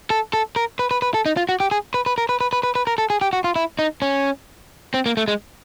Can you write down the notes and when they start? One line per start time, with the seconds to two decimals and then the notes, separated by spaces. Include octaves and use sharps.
0.10 A4
0.33 A4
0.56 A#4
0.79 B4
0.91 B4
1.02 B4
1.14 A4
1.26 D#4
1.37 F4
1.49 F#4
1.60 G4
1.71 G#4
1.94 B4
2.06 B4
2.18 A#4
2.29 B4
2.41 B4
2.53 B4
2.63 B4
2.75 B4
2.87 A#4
2.98 A4
3.10 G#4
3.21 G4
3.33 F#4
3.44 F4
3.56 E4
3.79 D#4
4.02 C#4
4.94 C4
5.06 A#3
5.17 A3
5.28 G#3